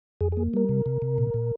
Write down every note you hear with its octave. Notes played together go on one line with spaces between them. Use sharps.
F2 G#4
A#3 G#4
G3 A#4
C3
C3
C3
A#2
A#2